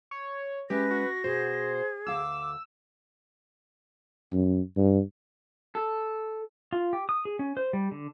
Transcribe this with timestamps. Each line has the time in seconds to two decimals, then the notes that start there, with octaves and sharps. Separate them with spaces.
0.11 C#5
0.70 G#3 C#4 G4 B4 E5 A#6
0.91 F#4
1.24 B2 F#4 G#4 C5
2.07 D2 F5 A5 D6 E6
4.33 F#2
4.77 G2
5.75 A4
6.73 F4
6.93 G4
7.09 D#6
7.25 G#4
7.39 C#4
7.57 C5
7.73 G3
7.92 D3